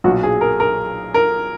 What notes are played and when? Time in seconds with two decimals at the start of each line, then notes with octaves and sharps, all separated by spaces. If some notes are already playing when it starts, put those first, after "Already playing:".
0.04 B1 A#2 F#3 F#4
0.23 G#4
0.41 A#4
0.60 A#4
1.14 A#4